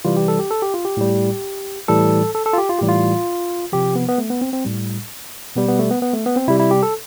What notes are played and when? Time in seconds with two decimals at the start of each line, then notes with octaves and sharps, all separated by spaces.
0.05 C3 E3 G3 F4
0.16 G4
0.28 A4
0.39 G4
0.51 A4
0.62 G4
0.74 F4
0.85 G4
0.97 A2 G3
1.88 A2 E3 G3 A4
2.35 A4
2.46 A4
2.53 F4
2.58 G4
2.69 F4
2.79 A2 E3 G3 G4
2.89 F4
3.73 C3 F3 G4
3.96 B3
4.09 B3
4.18 A3
4.30 B3
4.41 C4
4.53 C4
4.65 A2 G3
5.56 B2 G3 B3
5.68 B3
5.79 A3
5.91 B3
6.02 B3
6.13 A3
6.26 B3
6.36 C4
6.48 C3 G3 E4
6.60 E4
6.71 G4
6.83 A4